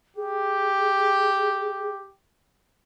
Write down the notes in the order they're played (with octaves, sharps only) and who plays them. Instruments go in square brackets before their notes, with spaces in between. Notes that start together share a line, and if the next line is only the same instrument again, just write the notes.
[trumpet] G4 [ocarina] G#4